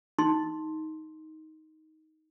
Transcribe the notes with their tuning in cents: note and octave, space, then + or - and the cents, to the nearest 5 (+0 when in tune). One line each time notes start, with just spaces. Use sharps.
D#4 +15 C6 +10